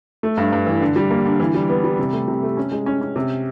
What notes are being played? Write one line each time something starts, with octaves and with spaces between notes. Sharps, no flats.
A3
G2
G2
E3
D3
G3
A#3
D3
E3
G3
B3
G3
C3
A3
C3
A3
C#4
G#3
C#4
C#4
C3